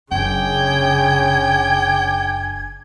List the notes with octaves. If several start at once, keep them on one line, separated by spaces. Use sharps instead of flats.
F#1 C#3 D4 F4 G5 G#5 G#6